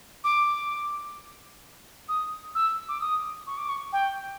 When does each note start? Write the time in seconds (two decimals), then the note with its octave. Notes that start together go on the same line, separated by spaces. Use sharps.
0.24 D6
2.09 D#6
2.55 E6
2.89 D6
3.01 D#6
3.47 C#6
3.58 D6
3.69 C#6
3.93 G5